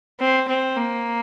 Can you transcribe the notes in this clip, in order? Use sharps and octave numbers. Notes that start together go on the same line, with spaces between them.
C4
C4
A#3